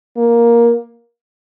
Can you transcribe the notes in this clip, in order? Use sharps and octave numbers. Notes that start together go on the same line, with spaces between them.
A#3